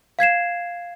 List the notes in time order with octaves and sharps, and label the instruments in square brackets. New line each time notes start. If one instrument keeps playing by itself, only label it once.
[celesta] F5 G#6 C7 E7